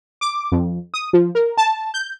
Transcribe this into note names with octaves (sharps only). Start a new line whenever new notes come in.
D6
F2
D#6
F3
A#4
A5
G6